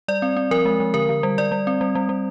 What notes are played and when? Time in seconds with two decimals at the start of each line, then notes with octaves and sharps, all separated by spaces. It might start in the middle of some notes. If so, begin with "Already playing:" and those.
0.08 G3 D5
0.22 C4
0.37 C4
0.51 F3 A#4
0.65 G#3
0.80 F3
0.94 D3 A#4
1.09 D3
1.23 G3
1.38 G3 D5
1.52 G3
1.67 C4
1.81 G3
1.95 G3
2.09 G3